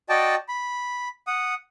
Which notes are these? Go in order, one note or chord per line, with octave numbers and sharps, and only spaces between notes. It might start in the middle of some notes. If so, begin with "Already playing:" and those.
F#4 D5 D#5 G5 A5
B5
F#5 D#6